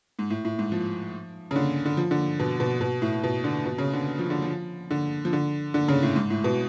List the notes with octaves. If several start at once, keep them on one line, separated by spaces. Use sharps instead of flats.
G#2
A2
A2
G#2
F3
C#3
D3
D3
F3
D3
B2
B2
B2
A2
B2
D3
B2
C#3
D3
F3
D3
F3
D3
F3
D3
D3
C#3
A2
G#2
A2
B2